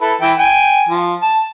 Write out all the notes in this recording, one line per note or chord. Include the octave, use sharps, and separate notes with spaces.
E4 A4 B4
E3 E4 G5
G5 G#5
F3
A5